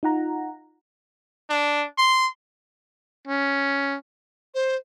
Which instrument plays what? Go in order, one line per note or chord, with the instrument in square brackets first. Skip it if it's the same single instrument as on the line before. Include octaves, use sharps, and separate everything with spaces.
[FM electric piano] D#4 F4 F#5 A#5
[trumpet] D4
C6
[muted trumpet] C#4
[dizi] C5